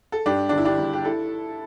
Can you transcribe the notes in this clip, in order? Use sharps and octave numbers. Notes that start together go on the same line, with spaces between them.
A4
G2 D4 G4
G1 D4
E4
D4 G4
G1
G4
E4 A4